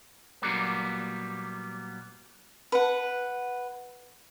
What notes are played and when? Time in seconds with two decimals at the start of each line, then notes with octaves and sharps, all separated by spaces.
0.42 A#2 F#3 G3 A#3 B3
2.72 B4 F#5